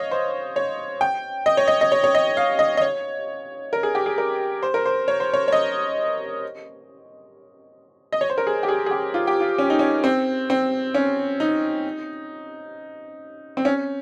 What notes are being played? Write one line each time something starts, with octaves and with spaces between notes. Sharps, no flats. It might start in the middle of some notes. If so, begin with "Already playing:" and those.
Already playing: C#5 D#5 F5
C5
C#5
G5
D#5
C#5
D#5
D#5
C#5
C#5
D#5
F5
D#5
D#5
C#5
A#4
G#4
G4
G#4
A#4
C5
A#4
C5
C#5
C5
C#5
C#5
D#5
D#5
C#5
C5
A#4
G#4
G4
G#4
G#4
G4
F4
G4
F4
C#4
D#4
C#4
C4
C4
C#4
D#4
C4
C#4